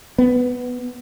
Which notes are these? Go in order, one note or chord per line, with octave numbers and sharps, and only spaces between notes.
B3